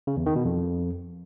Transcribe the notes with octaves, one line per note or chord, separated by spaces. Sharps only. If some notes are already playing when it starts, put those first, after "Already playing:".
C#3
E2
D#3
B2
F2